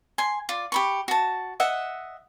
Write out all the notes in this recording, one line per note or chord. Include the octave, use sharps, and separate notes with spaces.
G#5 C6
F4 D5
G4 B5 C#6
F#4 A5
D#5 E5 F#5